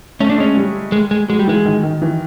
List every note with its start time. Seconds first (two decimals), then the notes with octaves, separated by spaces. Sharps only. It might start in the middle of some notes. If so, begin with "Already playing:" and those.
0.20 A3 C#4
0.29 D4
0.38 G#3 C#4
0.57 G3
0.92 G#3
1.11 G#3
1.28 F#3 G#3
1.39 G3
1.48 E3 G#3
1.65 D#3
1.83 D#3
2.02 E3